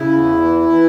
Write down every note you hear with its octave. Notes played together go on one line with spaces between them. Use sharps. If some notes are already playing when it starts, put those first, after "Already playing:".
Already playing: C#3 E4
E2
E3
E3